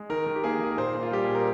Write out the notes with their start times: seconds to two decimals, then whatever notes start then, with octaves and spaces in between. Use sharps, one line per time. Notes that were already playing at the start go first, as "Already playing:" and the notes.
Already playing: G#3
0.10 D#3 A#4
0.27 D#3
0.36 G4
0.44 A#3 G#4
0.60 D#3 G#4
0.71 A#4
0.77 A#2 C5
0.95 A#3
1.03 F4
1.11 G3 G4
1.24 A#2 G#4
1.35 A#4